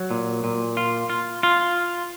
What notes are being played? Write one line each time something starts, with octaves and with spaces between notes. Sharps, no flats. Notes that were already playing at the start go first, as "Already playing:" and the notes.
Already playing: F#3
A#2
A#2
F4
F4
F4